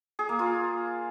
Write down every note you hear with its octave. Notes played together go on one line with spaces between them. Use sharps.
G#4
A#3
F4